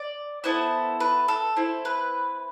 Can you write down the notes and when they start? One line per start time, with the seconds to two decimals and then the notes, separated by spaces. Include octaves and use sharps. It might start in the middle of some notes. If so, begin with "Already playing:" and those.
Already playing: D5
0.44 B3 E4 A4 C5
1.00 B4
1.28 A4
1.56 C4 E4 A4
1.85 B4